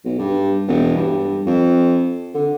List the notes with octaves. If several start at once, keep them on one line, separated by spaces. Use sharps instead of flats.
B1
G2
E1
G2
F2
D3